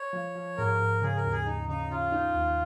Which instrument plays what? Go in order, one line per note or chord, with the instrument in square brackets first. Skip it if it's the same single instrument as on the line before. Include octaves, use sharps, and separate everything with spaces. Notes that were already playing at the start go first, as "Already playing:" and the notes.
Already playing: [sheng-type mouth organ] C#5
[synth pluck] F3
F3
[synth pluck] G#2 [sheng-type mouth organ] A#4
[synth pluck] G#2
[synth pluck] C#3 [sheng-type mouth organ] G#4
[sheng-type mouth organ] A#4
[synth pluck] D#2
[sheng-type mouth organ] G#4
[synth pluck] D#2 [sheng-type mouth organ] D#4
[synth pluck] C#3 [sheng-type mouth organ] D#4
[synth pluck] C#3 [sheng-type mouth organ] F4
[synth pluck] D#4
D#2